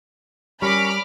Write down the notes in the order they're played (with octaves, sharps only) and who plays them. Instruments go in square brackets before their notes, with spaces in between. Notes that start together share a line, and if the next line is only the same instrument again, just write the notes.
[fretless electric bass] G3 [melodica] C#4 A#4 C#6 [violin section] B5 D6 F6